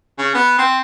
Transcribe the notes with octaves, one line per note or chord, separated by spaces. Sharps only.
C#3
B3
C4